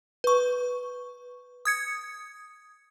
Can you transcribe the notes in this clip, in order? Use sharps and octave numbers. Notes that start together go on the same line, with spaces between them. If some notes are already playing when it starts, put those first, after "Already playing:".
B4 C#6
D#6 G#6 C#7